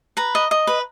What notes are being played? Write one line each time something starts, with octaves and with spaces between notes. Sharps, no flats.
B4 A#5
D#5
D#5
B4